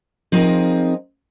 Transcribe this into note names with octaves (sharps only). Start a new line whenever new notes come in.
F3 C4 D#4 G#4 A#4